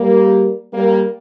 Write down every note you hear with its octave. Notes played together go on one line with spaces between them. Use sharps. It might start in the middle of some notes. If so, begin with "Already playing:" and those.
Already playing: G3 A#3
G3 A#3